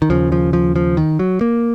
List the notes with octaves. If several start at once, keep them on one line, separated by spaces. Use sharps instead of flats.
D#3
D#2 C#3 F3
F3
F3
F3
D#3
F#3
A#3